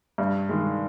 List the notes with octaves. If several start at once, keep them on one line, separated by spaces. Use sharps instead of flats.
G2
D#3 G#3